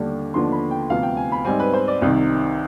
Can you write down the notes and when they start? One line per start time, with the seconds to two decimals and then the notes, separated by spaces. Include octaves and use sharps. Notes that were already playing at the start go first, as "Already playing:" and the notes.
Already playing: D#2 D3 G3 D4
0.34 D#2 D3 F3 B3 D4 C6
0.52 B5
0.71 G5
0.90 D2 C3 F3 B3 F5
1.03 G5
1.17 G#5
1.32 B5
1.45 G#2 G3 C4 G#5
1.59 B4
1.73 C5
1.88 D5
2.02 C2 C3 D#3